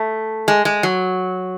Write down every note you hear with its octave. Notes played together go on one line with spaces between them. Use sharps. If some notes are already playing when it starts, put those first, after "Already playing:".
Already playing: A3
G#3
G#3
F#3